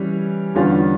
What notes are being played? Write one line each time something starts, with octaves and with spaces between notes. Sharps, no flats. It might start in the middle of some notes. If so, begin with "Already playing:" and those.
Already playing: E3 G3 C#4
E2 D3 G3 C#4 F4